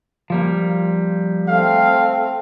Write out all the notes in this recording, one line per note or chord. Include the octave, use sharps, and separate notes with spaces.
F3 G3 A#3
A3 C4 F5